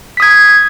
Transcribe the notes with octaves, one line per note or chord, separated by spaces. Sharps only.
D#6 G#6 B6